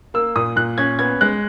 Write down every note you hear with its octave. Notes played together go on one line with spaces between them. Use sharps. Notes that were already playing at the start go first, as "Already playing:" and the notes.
A#3 E6
A#2 D#6
A#2 F#6
C#4 G#6
B3 G#6
G#3 F#6